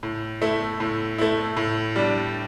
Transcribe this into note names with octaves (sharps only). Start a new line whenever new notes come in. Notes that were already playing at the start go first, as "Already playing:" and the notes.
A2
A3 E4
A2
A3 E4
A2
G3 D4